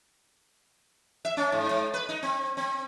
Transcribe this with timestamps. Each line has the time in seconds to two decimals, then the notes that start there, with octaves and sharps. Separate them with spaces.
1.25 E5
1.37 C#4
1.52 G#2
1.71 G#2
1.94 B4
2.09 D#4
2.23 C4
2.57 C4